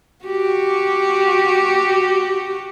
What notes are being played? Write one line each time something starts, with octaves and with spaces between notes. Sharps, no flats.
F#4 G4